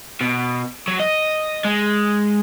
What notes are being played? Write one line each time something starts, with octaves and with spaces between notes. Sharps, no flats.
B2
F#3
D#5
G#3